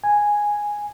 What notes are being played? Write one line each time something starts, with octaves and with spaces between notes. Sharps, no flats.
G#5